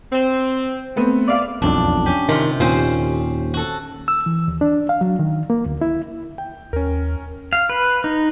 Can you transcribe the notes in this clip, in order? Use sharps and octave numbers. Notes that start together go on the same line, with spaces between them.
C4
A3 B3 C4
D5 E5 F5
E1 B1 F2 D4
C#4 G4
C3 D#3 F4
D#2 A#2 C4 C#4 C5
F#4 A4
E6
E3
D#2
D4
F5
F#3
D#3
A#3
D2
E4
G5
D#2 C#4 A#4
F5
B4
D#4